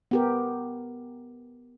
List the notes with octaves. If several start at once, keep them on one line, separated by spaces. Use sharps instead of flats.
B3 G4 A#4